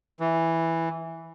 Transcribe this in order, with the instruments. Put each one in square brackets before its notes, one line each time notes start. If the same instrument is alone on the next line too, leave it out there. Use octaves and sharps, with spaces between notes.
[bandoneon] E3